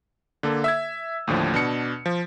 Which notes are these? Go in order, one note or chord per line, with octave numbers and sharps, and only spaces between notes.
D3 A#3 A4
E5 E6 G#6
D#2 A2 D3 F3
B2 D4 C#7
F3